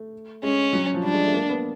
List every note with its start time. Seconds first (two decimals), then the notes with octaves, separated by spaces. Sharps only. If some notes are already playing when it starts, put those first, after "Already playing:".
Already playing: A3
0.43 G#3 C#4
0.73 F#3
0.94 F3
1.03 G3 D4
1.14 G#3
1.25 A3
1.34 A#3
1.49 B3